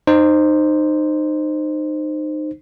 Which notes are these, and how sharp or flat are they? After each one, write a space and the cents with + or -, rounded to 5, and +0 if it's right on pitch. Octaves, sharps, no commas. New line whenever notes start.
D#4 -25 C5 +0